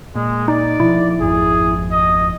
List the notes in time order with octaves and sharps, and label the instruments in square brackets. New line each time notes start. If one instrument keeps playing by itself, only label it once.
[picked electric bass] A#2 [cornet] G#3
[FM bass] D#4 [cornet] D5
[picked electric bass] B2 F3 [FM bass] E4
[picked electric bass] G#1 F2 [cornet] G#4
[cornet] D#5